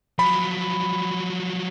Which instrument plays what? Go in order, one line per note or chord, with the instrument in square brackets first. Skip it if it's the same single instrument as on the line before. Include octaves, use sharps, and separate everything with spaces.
[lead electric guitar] F3 F#3 [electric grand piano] B5